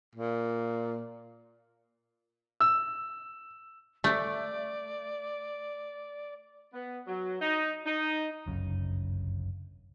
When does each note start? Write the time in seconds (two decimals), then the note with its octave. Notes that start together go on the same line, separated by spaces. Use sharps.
0.15 A#2
2.60 E6
4.04 A3 D5
6.73 B3
7.07 F#3
7.40 D#4
7.85 D#4
8.46 G1 C2 F#2 C#3